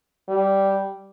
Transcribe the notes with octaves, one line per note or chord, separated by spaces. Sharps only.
G3